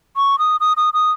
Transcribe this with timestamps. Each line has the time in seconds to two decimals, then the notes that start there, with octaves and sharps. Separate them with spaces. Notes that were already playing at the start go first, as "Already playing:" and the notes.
0.17 C#6
0.39 D#6
0.61 D#6
0.77 D#6
0.94 D#6